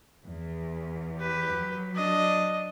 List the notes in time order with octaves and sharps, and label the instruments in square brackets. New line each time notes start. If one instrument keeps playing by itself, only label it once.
[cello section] E2
[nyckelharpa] G4 B4
[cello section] F#3
[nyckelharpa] D4 D#5